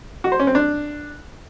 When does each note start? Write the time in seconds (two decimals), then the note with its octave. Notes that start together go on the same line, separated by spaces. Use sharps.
0.24 F#4
0.32 C5
0.39 C#4
0.47 C4
0.55 D4